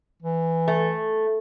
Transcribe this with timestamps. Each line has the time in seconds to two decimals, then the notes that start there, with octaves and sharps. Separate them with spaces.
0.22 E3
0.68 A3